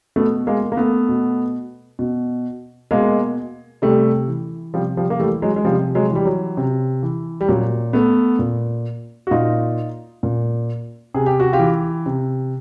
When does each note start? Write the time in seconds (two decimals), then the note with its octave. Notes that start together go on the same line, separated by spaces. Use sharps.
0.16 B2 A3 B3
0.47 G#3 A#3
0.72 A#3
0.77 A3 B3
1.09 B2
1.99 B2
2.91 B2 G#3 A#3
3.82 C3 G3 A3
4.28 E3
4.74 C3 F3 G3
4.97 F3 G3
5.10 A#3
5.20 E3 G3 A3
5.42 F#3 G#3
5.56 G#3
5.65 C3 F3 G3
5.95 F#3 G#3
6.11 E3 G3
6.26 F#3
6.57 C3
7.03 E3
7.41 G3
7.49 A#2 F#3
7.93 A3 B3
8.39 A#2
9.27 F#4
9.31 A#2 D#4 F4
10.23 A#2
11.14 C3 G#4
11.26 G4
11.40 F#4
11.53 F4 G4
11.59 E3
12.06 C3